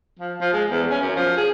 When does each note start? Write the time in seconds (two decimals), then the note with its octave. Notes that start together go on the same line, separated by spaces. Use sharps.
0.19 F3
0.41 F3
0.53 G#3
0.70 E2
0.90 C#4
1.01 F#2
1.16 F3
1.37 G#4